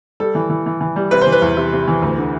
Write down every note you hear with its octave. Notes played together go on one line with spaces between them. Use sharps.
G3 A4
E3
E3
E3
E3
G3
C3 B4
E3 C5
B4
E2
C3
C3
E3
D2
D3